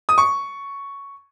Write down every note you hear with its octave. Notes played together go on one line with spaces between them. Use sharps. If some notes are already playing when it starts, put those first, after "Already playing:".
D#6
C#6